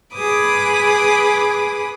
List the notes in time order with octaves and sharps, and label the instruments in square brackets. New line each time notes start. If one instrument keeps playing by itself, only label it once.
[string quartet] G#4 B4 B5 D6 D#6